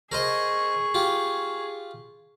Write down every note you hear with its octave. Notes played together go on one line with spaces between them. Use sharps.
G#4 A#4 C5 D#5 C#6
F4 G4